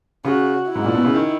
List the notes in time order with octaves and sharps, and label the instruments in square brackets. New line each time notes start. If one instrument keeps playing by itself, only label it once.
[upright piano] C#3 [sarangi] F#4
[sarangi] E4
[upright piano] G#2
A#2
B2
C#3
D#3